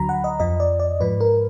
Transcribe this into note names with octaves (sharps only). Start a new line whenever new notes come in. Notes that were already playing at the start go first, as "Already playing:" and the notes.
Already playing: D2 D3 F#3 A#5 B5
F#5
D#5
F2 F3 D#5
D5
D5
G#2 F3 B4
A#4